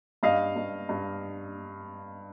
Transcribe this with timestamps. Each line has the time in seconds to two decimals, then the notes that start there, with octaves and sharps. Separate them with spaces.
0.23 G2 D#5 F5
0.56 G2
0.89 G2